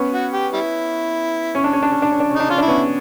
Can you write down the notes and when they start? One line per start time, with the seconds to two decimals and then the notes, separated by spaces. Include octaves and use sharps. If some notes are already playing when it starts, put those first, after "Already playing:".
Already playing: B3 C#4
0.12 F#4
0.32 G4
0.53 G3 E4
1.55 C#4
1.64 D4
1.73 C#4
1.82 D4
1.92 C#4
2.02 D4
2.12 C#4
2.20 D4
2.30 C#4
2.35 D4 D#4
2.49 C#4 F4
2.58 D4 E4
2.68 B3 C#4